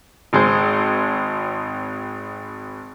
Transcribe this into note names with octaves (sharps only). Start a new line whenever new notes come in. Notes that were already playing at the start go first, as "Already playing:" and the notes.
G#1 G#3 C5